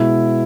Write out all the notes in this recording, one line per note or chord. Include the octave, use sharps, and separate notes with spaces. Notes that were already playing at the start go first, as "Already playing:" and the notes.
Already playing: B2 G#3 E4